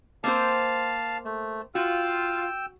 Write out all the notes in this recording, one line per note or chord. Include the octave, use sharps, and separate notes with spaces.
A#3 C4 C5 F5 A5
A3
F4 F#4 G5 E6